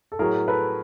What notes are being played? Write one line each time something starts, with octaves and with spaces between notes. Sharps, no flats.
A4
A2 F#3 G#4 A#4
A4 B4